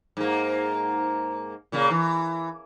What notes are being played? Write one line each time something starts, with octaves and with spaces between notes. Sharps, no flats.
G#2 A#3
A#2 C#3 A#3
E3